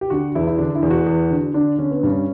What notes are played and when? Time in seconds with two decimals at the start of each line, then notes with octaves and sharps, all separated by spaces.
0.01 G4
0.10 D3 F#4
0.35 E2 E4
0.47 E4
0.58 D3 D4
0.75 E4
0.82 E2
0.91 F#4
1.06 E2
1.31 D3
1.54 D3 D4
1.78 D3 C#4
1.91 B3
2.03 G2 C#4